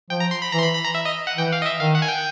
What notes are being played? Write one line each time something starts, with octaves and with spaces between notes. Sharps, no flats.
F3 G5
A#5
C6
B5
E3 A#5
C6
B5
B5
A#5
E5
D#5
F#5
E3 G5
F5
D#5
E5
D#3 F5
F#5
G#5
G5